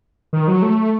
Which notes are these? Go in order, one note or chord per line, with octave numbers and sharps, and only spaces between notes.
D#3
F#3
A3